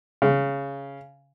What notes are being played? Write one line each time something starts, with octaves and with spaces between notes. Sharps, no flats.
C#3